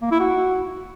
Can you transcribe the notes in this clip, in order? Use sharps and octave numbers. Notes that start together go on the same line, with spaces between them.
A#3
E4
F#4